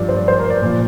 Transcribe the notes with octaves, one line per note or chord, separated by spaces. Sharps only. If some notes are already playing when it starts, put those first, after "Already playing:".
Already playing: G2 F3 D5
C5
D5
C5
A#4
D5
A#2 F3